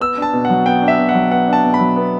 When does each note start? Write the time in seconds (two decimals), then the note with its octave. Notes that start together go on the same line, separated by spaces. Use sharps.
0.01 B3 E6
0.17 D4 A5
0.33 B2
0.45 F#5
0.50 F#3
0.66 B3 G5
0.82 D4
0.88 E5
0.99 B2
1.09 F#5
1.15 F#3
1.31 B3 F#5
1.47 D4
1.53 A5
1.64 B2
1.74 B5
1.80 F#3
1.96 B3